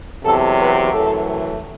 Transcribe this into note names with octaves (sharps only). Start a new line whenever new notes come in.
E2 C3 F#3 A4
B4
F#2 E3 A3 A4